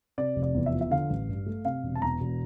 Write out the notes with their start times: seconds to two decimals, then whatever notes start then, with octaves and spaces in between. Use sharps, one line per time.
0.18 C3 D5
0.36 F1
0.43 D5
0.54 E2
0.66 E5
0.72 F3
0.81 E5
0.91 D3 F5
1.10 A1
1.29 G2
1.46 A3
1.65 C3 F5
1.83 E1
1.95 A5
2.02 E2 A#5
2.20 E1